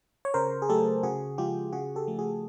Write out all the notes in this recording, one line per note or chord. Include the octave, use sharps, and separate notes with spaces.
C#5
C#3 A#4 C5
G#4
F#3 A3 G4 A4
C#3 F#4 G#4
F3 G#3 F4 G4
C#3 F#4 G#4
G4 A4
F3 A3
F#4 G#4